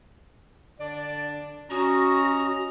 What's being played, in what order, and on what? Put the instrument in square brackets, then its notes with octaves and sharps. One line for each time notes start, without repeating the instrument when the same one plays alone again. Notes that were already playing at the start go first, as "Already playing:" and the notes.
[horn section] D3 D4 D5
[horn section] C#4 D#5 A#5 [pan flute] F#4